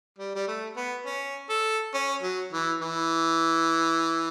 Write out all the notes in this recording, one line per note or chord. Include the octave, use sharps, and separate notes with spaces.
G3
G3
A3
B3
C#4
A4
C#4
F#3
E3
E3